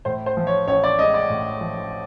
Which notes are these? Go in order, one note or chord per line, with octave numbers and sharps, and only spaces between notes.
A2 C5
C5
F3
C#5
A1 C#5
D5
G#3 D#5
D5
A2
F3